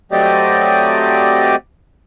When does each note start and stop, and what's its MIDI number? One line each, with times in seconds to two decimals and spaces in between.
0.12 1.56 54
0.12 1.56 57
0.12 1.56 60
0.12 1.56 67
0.12 1.56 74
0.12 1.56 75